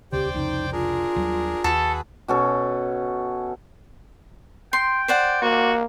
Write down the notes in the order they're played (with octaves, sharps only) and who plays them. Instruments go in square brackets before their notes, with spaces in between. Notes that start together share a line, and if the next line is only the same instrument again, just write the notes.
[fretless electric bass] D#1 C#2 C#3 [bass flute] G4 [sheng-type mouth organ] C5 D5 G5
[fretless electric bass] C2 F2 C#3 [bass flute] D#4
[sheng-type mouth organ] D4 G#4 A#4 [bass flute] F4
[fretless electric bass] D#2 F#3 G3
[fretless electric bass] D#2 [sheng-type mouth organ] F#4 G#4 B4 [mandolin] A4
[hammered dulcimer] B2 C#4 A4
[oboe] G5 [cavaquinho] C6
[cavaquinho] C5 D5 F#5
[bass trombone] A#3 [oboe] F#4